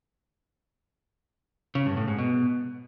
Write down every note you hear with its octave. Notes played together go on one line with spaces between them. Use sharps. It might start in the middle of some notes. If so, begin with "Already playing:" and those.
C#3
G2
A2
G#2
B2